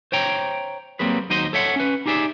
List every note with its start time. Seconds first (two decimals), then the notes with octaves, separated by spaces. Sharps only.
0.12 C5 C#5 G5 A#5
0.99 F#3 G3 A#3 C4 G#4 B4
1.30 D#2 F#3 D#4 C5 D#5 C6
1.53 A4 C#5 E5 F#5
1.76 C#4 B4
2.06 D#4 G4 G#4 D5 E5